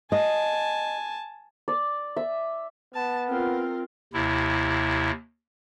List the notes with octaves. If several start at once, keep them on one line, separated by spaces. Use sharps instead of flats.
D#5 G#5 A5
D5
E5
B3 A5
C4 F4 A#4
D#2 C3 E4